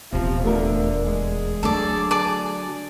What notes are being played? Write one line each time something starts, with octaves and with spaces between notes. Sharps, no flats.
D#1 E2 C3 F3
D3 A3 A#4
G#3 G#4
D3 F#3 A3 A4 D5
D5 A5